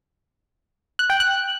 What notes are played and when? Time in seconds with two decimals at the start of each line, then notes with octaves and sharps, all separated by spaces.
0.99 F#6
1.10 G5
1.20 F#6